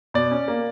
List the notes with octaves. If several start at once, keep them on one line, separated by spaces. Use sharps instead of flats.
B2 D5
C#4
A#3